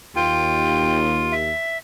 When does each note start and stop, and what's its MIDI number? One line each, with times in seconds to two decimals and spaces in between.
0.16 1.50 39
0.16 1.34 65
0.16 0.98 79
1.32 1.77 76